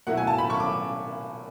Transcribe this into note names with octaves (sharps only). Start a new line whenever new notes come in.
B2 F#3 A3 E4 F#5
G#5
A5
B5
C#6
D6